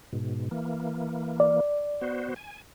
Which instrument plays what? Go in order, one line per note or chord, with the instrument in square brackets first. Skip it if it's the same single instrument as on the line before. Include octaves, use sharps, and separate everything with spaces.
[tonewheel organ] G#2 B2
E3 A#3
[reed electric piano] D5
[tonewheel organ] B3 F#4 C5
G#5